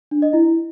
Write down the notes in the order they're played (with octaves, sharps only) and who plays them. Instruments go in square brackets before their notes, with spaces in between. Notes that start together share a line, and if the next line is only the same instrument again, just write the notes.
[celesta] D4
D#5
E4